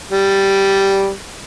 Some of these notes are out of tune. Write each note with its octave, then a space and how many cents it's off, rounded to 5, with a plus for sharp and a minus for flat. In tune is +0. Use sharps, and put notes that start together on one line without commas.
G3 -5